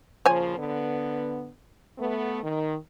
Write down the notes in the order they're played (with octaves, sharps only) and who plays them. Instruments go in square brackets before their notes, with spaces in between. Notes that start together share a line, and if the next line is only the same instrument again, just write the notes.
[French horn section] A#2 C#3 F3 [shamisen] C5 C#5 G#5
[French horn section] D3 B3
A3 B3
D#3